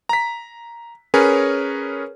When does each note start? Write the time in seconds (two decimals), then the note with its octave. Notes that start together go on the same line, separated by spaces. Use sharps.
0.09 A#5 B6
1.14 C#4 G#4 A#4 B4 C#5